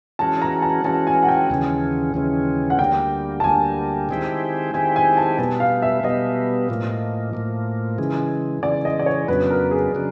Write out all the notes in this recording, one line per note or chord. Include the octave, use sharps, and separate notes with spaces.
E3 G#3 C#4 F#4 A5
A#5
A5
E3 G#3 C#4 F#4 A5
G#5
F#5
G5
D#2 C#3 E3 G#3 C#4
D#2 C#3 E3 G#3 C#4
F#5
D2 D3 G3 A#3 G5
A5
D2 D3 G3 A#3 G#5
D#3 G#3 C4 E4 G4
D#3 G#3 C4 E4 G4 G#5
G#5
A5
B2 G3 B3 A5
F5
E5
B2 G3 B3 D#5
A2 F3 A#3
A2 F3 A#3
C#3 E3 G#3
C#3 E3 G#3 D5
D#5
D5
C#5
F2 C#3 F#3 B3 D4 B4
A#4
G#4
C#3 F#3 D4